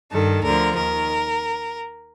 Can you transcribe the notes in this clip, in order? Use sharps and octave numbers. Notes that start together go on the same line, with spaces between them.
G2 D#3 A4
D2 D3 F3 A#4
D#2 D#3 A#4